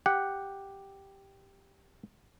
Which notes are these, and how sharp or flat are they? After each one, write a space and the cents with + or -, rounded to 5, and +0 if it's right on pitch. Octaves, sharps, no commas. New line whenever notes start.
G4 +0 F#5 +0